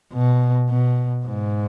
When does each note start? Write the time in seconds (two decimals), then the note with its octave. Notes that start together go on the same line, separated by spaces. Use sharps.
0.13 B2
0.69 B2
1.25 G#2